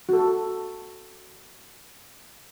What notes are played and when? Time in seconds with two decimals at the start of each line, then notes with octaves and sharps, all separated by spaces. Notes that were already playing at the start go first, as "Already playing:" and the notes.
0.09 F#4 A4